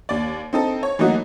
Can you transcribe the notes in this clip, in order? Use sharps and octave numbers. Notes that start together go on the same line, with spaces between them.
D#2 D5
C4 D#4 A4
C#5
E3 F#3 A3 A#3 D#4 F#4